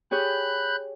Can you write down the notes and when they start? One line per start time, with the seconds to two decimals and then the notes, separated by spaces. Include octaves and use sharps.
0.11 G4 G#4 C#5 B5 F#6 G6